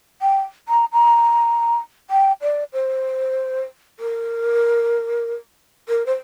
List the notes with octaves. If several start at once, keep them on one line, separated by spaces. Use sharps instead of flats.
G5
A#5
A#5
G5
D5
C5
A#4
A#4
C5